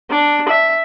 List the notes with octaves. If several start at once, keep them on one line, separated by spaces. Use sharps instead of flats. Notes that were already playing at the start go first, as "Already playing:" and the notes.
D4
E5